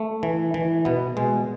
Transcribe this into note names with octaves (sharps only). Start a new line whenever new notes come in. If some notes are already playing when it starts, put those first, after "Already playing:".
Already playing: A3
E3
E3
B2 B3
B2 G#3